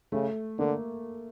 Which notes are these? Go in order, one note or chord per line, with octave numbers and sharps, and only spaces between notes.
C#3 A3
D3 A#3